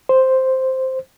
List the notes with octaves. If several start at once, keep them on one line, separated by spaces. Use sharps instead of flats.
C5